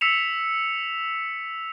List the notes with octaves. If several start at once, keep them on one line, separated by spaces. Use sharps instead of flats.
E6 B6 C#7 E7 F7